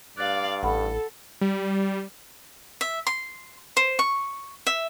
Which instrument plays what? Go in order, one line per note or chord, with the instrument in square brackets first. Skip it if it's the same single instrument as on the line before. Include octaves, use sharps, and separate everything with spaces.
[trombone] G2 [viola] D5 F5 [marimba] F#6 A6
[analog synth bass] A1 [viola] A4 [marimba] F#5 B5
[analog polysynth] G3
[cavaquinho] E5
C6
C5
C#6
E5